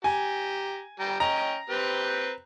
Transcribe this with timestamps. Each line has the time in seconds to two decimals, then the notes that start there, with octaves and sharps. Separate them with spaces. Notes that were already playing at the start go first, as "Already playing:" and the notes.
0.04 G4 G#5 A#5
1.00 G3 G5 A#5
1.20 C#4 D#5 G5 A#5
1.70 C4 G4 B4